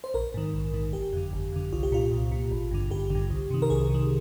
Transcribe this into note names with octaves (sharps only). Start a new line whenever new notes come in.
C5
A#1 A#4
G#2 D#3
A#1
G#2 D#3
G1 G4
F2 D3
G1
F2 D3
C2 F4
G4
A#2 F4
C2
A#2
G#1
G2 D3
G#1 G4
G2 D3
C2
C3 D#3
A#4
C2 G#4
C3 D#3